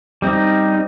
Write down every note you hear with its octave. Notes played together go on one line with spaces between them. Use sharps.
G3 C4 D#4